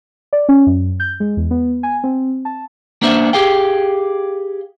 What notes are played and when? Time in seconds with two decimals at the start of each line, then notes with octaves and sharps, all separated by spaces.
0.33 D5
0.49 C#4
0.67 F#2
1.00 G6
1.20 G#3
1.37 E2
1.51 B3
1.83 G#5
2.04 C4
2.45 A5
3.02 A#3 B3 D4 C5 E5
3.33 G4 G#4 F5 G5